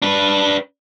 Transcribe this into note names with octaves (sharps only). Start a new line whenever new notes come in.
D4 B4